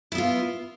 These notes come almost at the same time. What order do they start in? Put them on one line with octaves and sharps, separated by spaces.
E4 B3 F4